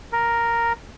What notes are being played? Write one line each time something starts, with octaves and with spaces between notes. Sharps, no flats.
A#4